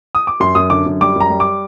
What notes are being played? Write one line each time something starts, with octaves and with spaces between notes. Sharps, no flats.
D#6
D6
F#2 C6
F#2 D#6
D3 D6
F#2
G3 D6
F#2 A#5
G3
D6